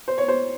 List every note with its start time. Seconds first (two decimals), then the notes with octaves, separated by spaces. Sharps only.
0.08 C5
0.18 C#5
0.28 C5